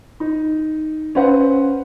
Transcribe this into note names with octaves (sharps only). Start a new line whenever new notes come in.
D#4
C#4 B4 C5 F5 F#5